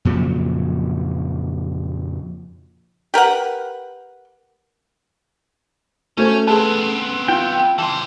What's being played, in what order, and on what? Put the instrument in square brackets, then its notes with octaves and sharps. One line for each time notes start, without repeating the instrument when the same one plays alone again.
[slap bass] F2 A#2 C#3 F#3
[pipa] G4 A#4 B4 F#5
[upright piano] A3 [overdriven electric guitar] C#4 [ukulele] F#4 C5 C#5
[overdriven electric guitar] B3 C4 [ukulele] G#4 B4 A5
[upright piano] F4 [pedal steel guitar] G5
[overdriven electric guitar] E3 C5 [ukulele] A5